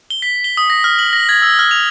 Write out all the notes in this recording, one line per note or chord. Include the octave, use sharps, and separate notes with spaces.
G7
B6
G7
D#6
A#6
F6
F#7
A#6
G#6
E6
F6
F7